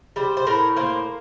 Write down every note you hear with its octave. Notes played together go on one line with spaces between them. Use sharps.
G3 C5
C5
A2 A#4
A#3 C5